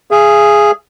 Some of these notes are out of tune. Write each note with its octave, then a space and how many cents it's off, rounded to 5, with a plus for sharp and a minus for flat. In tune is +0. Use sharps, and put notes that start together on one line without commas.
G#4 +0 F5 -45